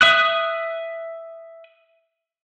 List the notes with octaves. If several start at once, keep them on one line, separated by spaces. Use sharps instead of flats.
E5 D#6 F#6